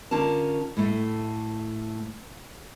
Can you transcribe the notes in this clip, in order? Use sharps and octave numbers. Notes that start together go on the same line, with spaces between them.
D3 C#4 F4 A#4 A5
A2 A3